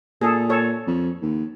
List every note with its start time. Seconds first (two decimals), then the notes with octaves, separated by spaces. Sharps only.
0.21 A#2 G#4 A4
0.50 A4 C#5
0.87 F2
1.22 D#2